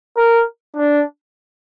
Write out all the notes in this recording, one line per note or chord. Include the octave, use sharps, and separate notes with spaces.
A#4
D4